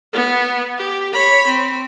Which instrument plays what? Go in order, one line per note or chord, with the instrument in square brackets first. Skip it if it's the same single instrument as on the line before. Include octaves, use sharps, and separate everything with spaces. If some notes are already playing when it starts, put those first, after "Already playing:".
[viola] B3
G4
C#5 B5
C4